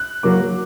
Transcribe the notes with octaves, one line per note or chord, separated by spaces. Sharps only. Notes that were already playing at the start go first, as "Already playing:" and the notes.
Already playing: F#6
F#3 A#3 D6